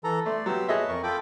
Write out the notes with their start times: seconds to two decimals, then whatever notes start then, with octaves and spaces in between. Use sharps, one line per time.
0.04 E3 A4 A#5
0.26 A3 D5 C6
0.46 F#3 B3 G4 E6
0.68 G#4 B4 C#5 D#5 E5 A5
0.89 F2 A#4 C#6
1.03 F4 A4 G5 B5 D6